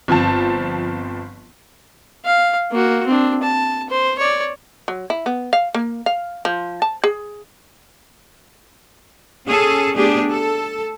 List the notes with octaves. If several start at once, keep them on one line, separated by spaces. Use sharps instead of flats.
G1 F3 C4 A5
F5
A#3 F#4
C4 D4
A5
C5
C#5 D5
F#3
E4
B3
F5
A#3
F5
F3
A5
G#4
C#4 G#4 A4
A3 B3 D4 G4 G#4
A4